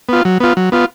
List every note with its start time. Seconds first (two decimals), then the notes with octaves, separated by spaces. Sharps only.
0.09 B3 F4
0.25 F#3
0.40 B3 F4
0.57 F#3
0.72 B3 F4